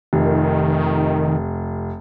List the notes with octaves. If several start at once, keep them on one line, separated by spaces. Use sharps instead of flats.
F1 D#3